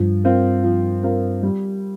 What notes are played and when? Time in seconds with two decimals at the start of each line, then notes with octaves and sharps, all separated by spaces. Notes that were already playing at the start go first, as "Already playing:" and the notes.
Already playing: G2 F3
0.24 C4 F4 A#4
0.63 F3
1.03 C4 F4 A#4
1.43 G3